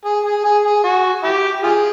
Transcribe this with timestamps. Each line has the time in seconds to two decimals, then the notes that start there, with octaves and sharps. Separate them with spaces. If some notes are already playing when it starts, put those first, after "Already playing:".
0.05 G#4
0.25 G#4
0.44 G#4
0.65 G#4
0.84 F#4
1.23 E4 G4
1.63 F4 G#4